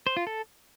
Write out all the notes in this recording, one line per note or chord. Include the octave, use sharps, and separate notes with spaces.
C5
F4
A4